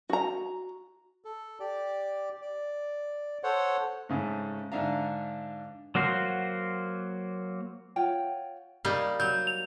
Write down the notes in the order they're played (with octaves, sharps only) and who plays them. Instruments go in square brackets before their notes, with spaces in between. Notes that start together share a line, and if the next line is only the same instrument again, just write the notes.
[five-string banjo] F#4 A#5
[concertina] A4
G4 D5
D5
A4 C5 C#5 F#5
[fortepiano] G#2 C#3 A3
G#2 D3 D4 E5 F5 A#5
[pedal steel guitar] F#3 A#3 F#4 C5
[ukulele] F4 C#5 F#5 G5
[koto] G3 A#3 D#4
[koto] F#3 [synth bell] G6
[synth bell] F7